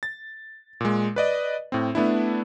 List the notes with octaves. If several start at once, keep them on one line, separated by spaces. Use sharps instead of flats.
A6
A#2 G#3
B4 D5 D#5
A2 C4
A3 B3 D4 E4